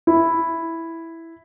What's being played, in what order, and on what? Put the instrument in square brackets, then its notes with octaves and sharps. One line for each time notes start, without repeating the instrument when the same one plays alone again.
[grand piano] E4